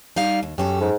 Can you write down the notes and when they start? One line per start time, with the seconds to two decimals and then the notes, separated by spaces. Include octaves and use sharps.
0.16 G3 D#4 F5
0.43 D#2
0.58 F#2 C#4 G4 A4
0.81 G#2